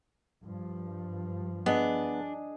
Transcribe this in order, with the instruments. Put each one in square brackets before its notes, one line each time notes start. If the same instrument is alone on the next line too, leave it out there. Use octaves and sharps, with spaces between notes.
[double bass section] G2 F3
[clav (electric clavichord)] B3 [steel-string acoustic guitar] D4 [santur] G#4 D#5